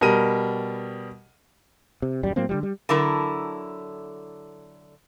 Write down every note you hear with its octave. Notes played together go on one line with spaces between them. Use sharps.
B2 G3 A#4 D#7
C3
D#1 F#2 G3
A2 F#3 A#3 C4
D3 F3 G3
G3
D3 F#3 E4 A4 A#4